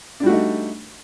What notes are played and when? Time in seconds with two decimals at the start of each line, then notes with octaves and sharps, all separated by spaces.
0.20 D4
0.23 G3
0.26 F#4
0.29 A3
0.32 D#4